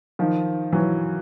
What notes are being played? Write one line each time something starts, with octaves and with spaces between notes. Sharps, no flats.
D#3 F3
E3 F#3